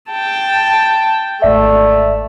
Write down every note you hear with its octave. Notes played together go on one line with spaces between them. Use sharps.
G5 A5
G#1 A3 D5 E5